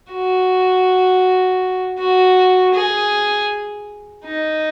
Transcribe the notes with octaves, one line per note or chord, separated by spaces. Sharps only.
F#4
F#4
G#4
D#4